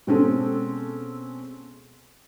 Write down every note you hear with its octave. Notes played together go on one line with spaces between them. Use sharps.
B2 G#3 C4 C#4 A4